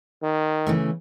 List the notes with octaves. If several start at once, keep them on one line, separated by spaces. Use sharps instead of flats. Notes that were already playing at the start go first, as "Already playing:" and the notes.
D#3
C#3 E3 A3